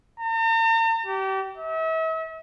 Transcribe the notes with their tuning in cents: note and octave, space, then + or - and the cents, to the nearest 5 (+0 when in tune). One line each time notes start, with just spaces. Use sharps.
A#5 -45
G4 -30
E5 -40